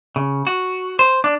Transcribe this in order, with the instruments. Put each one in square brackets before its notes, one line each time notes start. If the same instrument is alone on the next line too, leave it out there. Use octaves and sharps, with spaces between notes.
[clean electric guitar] C#3
F#4
C5
D4